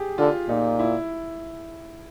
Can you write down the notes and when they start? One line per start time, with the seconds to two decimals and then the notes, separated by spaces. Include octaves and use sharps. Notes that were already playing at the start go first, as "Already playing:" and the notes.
Already playing: G4 G#4
0.18 D3 F4
0.49 A#2 D#4
0.79 E4